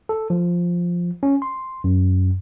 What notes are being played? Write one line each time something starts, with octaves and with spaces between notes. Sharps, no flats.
A4
F3
C#4
C6
F#2